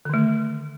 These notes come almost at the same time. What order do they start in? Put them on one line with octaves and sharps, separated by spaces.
D3 D#3 A3